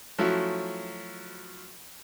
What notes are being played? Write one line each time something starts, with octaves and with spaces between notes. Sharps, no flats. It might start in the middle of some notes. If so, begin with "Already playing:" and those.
F3 F#3 A3 C#4 E4 F#4